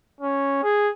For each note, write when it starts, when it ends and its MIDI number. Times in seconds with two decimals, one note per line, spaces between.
0.21 0.63 61
0.63 0.90 68